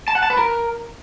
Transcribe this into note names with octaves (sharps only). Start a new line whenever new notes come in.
A5
F#5
A5
B4
A#4